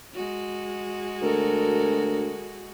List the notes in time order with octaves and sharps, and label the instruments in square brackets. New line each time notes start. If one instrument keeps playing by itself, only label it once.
[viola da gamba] G#3 F#4
[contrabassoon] D2 [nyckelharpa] A4 A#4